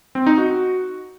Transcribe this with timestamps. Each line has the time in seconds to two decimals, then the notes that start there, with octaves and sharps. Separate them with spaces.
0.15 C4
0.26 D#4
0.38 F#4